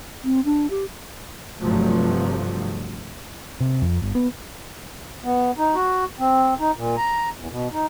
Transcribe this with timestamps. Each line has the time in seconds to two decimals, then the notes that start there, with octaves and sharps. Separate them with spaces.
0.24 C4
0.45 D4
0.70 G4
1.60 G1 G2 C3 F3 F#3 A3
3.61 C3
3.82 F2
4.02 G1
4.15 B3
5.24 B3
5.58 D#4
5.75 F#4
6.19 C4
6.59 D#4
6.76 A#2
6.97 A#5
7.37 E2
7.50 B2
7.72 D#4